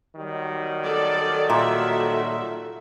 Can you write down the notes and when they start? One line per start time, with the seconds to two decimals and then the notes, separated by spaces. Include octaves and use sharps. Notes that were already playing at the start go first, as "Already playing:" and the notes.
0.16 D#3 F#3 G3
0.84 A4 D5
1.50 A#2 F#4 A4 E5